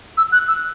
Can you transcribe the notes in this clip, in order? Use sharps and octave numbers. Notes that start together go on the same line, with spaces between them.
E6
F#6
E6